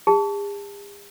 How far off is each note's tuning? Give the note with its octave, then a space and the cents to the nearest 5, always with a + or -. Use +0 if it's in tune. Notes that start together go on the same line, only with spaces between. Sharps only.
G#4 -45 A5 +0